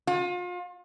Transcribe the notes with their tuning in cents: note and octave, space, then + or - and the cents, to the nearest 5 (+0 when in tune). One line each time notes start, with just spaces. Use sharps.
F4 +35